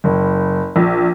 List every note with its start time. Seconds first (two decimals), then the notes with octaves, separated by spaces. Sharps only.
0.04 F#1
0.76 A#1